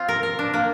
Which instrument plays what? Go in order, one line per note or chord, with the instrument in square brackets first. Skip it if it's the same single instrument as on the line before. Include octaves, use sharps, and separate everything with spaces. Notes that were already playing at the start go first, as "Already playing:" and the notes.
Already playing: [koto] C4 F4
A#4
A#4
D4
A#3